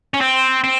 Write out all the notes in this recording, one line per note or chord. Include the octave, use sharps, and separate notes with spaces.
C#4
C4
C4